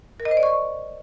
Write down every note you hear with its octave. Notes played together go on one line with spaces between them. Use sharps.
A#4
D#5
C5
D5
C#6